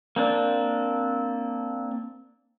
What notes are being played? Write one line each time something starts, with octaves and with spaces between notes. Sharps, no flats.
A#3 C4 D4